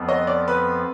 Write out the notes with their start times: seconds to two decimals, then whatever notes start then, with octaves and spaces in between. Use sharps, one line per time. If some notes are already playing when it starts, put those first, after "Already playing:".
Already playing: F2 F3 B3
0.09 D#5
0.27 D5
0.48 B4